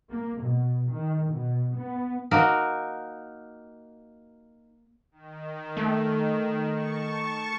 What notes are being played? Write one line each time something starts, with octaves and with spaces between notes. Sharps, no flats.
A#3
B2
D#3
B2
B3
A#3 D#4 F#4 A#4
D#3
A3
A5 C#6